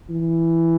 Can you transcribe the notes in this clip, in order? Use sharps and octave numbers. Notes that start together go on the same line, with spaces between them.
E3